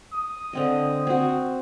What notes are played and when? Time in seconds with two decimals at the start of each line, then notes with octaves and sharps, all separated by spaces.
0.13 D#6
0.53 D3 C4 D#5
1.07 C4 F#4